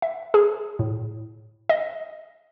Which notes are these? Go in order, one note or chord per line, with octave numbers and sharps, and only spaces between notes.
E5
G#4
A2
D#5